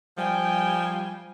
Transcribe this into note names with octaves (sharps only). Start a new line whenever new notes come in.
F3 G3 G5 G#5